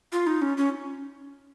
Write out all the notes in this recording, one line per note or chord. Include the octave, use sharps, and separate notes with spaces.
F4
D#4
C#4
C#4